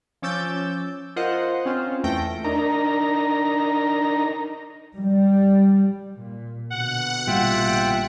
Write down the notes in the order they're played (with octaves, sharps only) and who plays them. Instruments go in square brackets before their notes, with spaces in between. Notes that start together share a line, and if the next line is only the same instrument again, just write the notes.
[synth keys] F3 C#4 D6 E6 G6 A6
F4 A#4 C5 D#5 F#5
C4 C#4 F4 C5
E2 A3 G5 G6 A#6
[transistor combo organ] D4 D#4 A#4 A#5
[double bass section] G3
A#2
[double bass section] B2 D3 [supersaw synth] F#5
[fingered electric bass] A1 A#2 G3 [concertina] F4 E5 G5 [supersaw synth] F#5